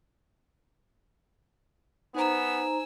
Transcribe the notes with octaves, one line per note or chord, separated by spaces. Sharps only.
B3 D#4 C5 G#5 A#5 E6